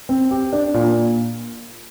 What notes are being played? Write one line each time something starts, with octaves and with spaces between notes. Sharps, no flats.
C4
G4
D4
A#2